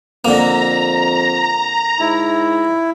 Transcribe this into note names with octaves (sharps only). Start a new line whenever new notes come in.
F2 D3 A#3 A#5
G#2 E4